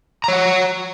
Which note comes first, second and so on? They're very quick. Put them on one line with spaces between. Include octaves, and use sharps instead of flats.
A#5 C#5 F#5